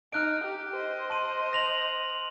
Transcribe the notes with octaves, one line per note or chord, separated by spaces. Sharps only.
D#4 F6 F#6 D7
G4
C5 D#5
A5 C6 D#7
A#6 F7 F#7